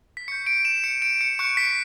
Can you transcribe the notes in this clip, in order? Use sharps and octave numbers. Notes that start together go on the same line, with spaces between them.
B6
C#6 G6 C#7
D7
E7
C#7
D7
C#7
C#6 F#6 C#7
B6